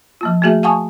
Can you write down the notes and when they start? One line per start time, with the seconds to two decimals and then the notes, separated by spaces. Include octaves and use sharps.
0.21 F3 A#3 F4
0.42 A3 A#3 F#4 G#4 E5
0.63 F5 F#5 G#5 A5 C#6 D#6